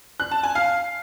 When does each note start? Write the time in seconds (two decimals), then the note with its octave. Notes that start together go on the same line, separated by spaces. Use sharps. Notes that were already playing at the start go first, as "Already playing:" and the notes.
0.20 F#6
0.31 A5
0.43 G#5
0.55 F5